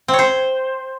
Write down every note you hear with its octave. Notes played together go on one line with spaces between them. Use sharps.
C4
C#5
C5